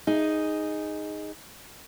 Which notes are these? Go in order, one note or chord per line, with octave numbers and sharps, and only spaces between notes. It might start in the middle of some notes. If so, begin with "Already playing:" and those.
D#4 G#4